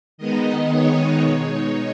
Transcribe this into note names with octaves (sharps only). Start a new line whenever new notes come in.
D#3 G#3 B3 D#4 D#5
C#5
B2 G#3 D#4